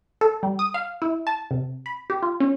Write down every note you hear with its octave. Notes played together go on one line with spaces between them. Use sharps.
A4
G3
D#6
F5
E4
A5
C3
B5
G4
F4
C#4